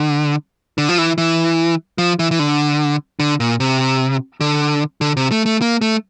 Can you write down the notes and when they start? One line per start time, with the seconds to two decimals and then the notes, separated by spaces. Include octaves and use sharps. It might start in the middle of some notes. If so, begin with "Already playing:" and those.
Already playing: D3
0.78 D3
0.89 F3
0.98 E3
1.18 E3
1.98 F3
2.19 E3
2.31 E3
2.39 D3
3.20 D3
3.40 A#2
3.60 C3
4.41 D3
5.01 D3
5.17 C3
5.31 A3
5.46 A3
5.62 A#3
5.81 A3